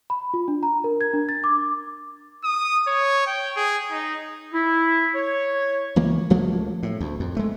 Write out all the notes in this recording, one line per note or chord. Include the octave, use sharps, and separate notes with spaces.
B5
F4
D4
A#5
A#4
G#6
D4
A6
D6
D#6
C#5
G5
G#4
D#4
E4
C#5
C#2 E3 A#3
C#2 F3 A3 A#3
A2
D2
F2
G#3 A3